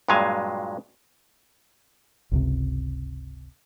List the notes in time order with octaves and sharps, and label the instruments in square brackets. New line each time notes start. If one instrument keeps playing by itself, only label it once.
[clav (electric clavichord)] G2 A#2 F#3 G#3 F5 G#5
[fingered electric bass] G1 C#2 C3